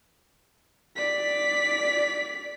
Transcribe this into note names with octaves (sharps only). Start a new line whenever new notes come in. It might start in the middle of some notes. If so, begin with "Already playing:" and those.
D5 B6